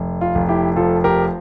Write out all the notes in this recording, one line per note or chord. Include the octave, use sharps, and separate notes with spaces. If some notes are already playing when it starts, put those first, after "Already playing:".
Already playing: F1
F4
F1
E4 G4
F3 F4 A4
G4 A#4